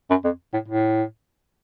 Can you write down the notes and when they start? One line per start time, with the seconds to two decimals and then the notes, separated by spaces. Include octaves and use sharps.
0.10 F#2
0.24 F2
0.53 A2
0.68 A2